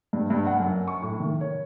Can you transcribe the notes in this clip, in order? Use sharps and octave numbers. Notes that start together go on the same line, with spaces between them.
G2
G2
F#5
F#2
C#6
A2
D#3
C#5